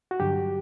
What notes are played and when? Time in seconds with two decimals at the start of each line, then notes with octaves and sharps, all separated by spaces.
0.11 F#4
0.20 G2 D3 F#3 G4